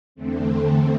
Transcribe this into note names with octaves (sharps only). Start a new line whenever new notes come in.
E2 D3 A3 C4